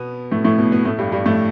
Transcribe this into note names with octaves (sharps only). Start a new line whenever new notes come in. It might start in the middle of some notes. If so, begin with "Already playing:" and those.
Already playing: B2 B3
A2 A3
A2 A3
B2 B3
B2 B3
A2 A3
G2 G3
G2 G3
A2 A3